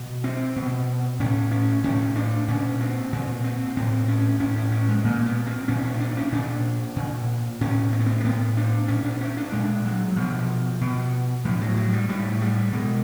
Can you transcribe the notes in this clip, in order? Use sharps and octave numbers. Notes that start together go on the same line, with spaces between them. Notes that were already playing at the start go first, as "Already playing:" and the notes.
Already playing: B2
C4
B2
A2 C#4
C#4
A2 C#4
D4
A#2 C#4
C4
A#2 C4
C4
A2 C4
C#4
A2 C#4
C#4
C#4
G#3
A#2 A#3
B3
C4
A#2 C#4
C#4
D4
C#4
A#2 D4
A#2
A2 C#4
C4
B3
C4
A#3
A2 B3
D4
A#2 C#4
D4
C#4
D4
A#2 G#3
F#3
B2 F3
B2
A2 F3
F#3
F#3
G3
A2 G3
G3
B2 G#3